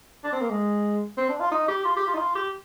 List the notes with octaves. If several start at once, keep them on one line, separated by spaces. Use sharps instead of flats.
D4
C4
A#3
G#3
C4
D4
F4
D#4
G4
F4
G4
F4
D#4
F4
G4